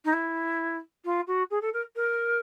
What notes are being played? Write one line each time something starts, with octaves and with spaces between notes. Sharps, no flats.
D#4
E4
F4
F#4
G#4
A4
A#4
A#4